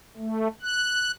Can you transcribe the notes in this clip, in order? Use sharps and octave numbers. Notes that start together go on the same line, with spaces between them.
A3
F#6